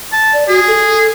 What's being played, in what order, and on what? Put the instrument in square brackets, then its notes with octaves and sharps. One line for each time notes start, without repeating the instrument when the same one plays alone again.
[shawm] A5
[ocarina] D5
[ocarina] F#4 [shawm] G#4
[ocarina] A4